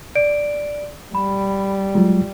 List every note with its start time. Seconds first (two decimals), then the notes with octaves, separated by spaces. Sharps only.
0.15 D5 D7
1.15 G3 B5
1.95 F#3 G#3 F4